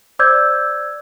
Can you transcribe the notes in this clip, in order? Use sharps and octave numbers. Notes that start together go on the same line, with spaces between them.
C5 D5 D6 E6 G6 G#6